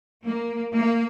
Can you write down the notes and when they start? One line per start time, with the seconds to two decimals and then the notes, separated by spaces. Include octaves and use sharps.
0.23 A#3
0.74 A#3